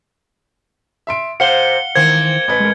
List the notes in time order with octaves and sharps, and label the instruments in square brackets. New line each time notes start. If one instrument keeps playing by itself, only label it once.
[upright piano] E5 C6 D7
[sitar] C3 C5 [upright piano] F5 F#5 [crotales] C#7 G7
[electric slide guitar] D#3 E3 C5 [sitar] A#3 C4 [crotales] G#6
[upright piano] A1 B4
[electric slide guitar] G#3 A#4